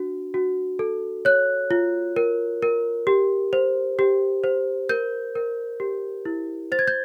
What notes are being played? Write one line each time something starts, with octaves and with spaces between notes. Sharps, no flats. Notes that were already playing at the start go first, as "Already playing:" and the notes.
Already playing: D4 F#4
F#4
A4
C#5 F#6
F4
A#4
A#4
G4
C5
G4
C5
A#4 G6
A#4
G4
E4
C5 A6
G#6
G6